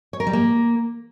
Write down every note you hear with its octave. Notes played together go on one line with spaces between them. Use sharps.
C#5
A#4
G3
A#3